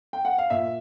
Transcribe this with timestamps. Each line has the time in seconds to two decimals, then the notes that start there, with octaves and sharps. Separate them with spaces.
0.13 G5
0.25 F#5
0.38 F5
0.50 A#2 E5